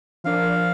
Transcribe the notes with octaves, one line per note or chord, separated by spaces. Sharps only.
F3 D4 A#4 D5 F5